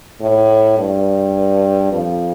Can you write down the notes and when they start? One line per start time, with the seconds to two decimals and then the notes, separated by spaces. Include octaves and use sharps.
0.21 A2
0.79 G2
1.92 F2